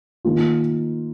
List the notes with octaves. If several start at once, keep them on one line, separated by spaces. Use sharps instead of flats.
D#3 A#3 F4